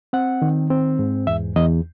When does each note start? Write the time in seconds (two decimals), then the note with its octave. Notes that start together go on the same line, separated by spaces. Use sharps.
0.13 C4 F#5
0.42 D#3
0.70 C4
0.99 G#2
1.27 E2 E5
1.56 E2 D#5